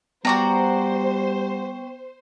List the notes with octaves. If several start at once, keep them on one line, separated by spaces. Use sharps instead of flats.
G3 B3 F#4 C5 D5 G5 A#5 C#6